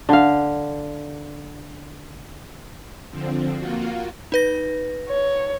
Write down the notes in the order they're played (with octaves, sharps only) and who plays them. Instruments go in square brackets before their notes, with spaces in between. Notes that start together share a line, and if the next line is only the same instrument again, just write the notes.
[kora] D3 F5
[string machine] D3 F3 C4
A#3 F4 F#4
[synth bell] D#4 B4 A#6
[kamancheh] C#5